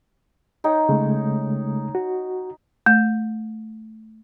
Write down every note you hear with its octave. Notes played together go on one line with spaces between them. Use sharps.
D#4 C#5 G5
C#3 G#3 A3
F#4
A3